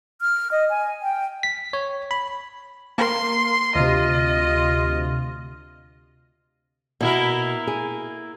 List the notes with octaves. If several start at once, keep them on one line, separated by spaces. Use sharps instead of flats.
F6
D#5
G#5
G5
B6
C#5
B5
A#3 A#4 C6
D2 C3 F4 D#5
B2 A#3 E4 A#4
G#4